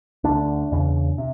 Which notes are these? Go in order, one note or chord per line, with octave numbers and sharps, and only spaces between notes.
D2 D3 D4
E2 C#3
C3